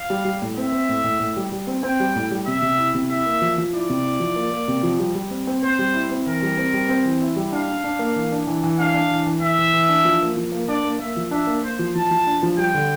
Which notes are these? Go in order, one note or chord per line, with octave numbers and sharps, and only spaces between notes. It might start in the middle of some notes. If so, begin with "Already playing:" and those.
Already playing: F5
G3
G3
A2
C4 E5
C4
A2
A2
A2
G3
G3
C4
C4 G5
G3
A2
G3
C3 E5
C3
E4
C3
E4 E5
A#3
F3
F3
E4 D5
C3
E4
F3
A#3
A#3
C3
F3
G3
G3
C4
C4
C4 C5
G3
E4
C4
E3 A#4
G3
C4
G3
C4
E3
E4
G3
D4 F5
D4
D4
A#3
E3
D4
E3
E3
D4 F5
D4
E3
E3
E3 E5
E3
E3
D4
F3
A#3
F3
A#3
D4 D5
A#3
A#3 E5
F3
D4 E5
A#3
A#3 C5
F3
F3 A5
F3
D4
F3
G3 G5
D3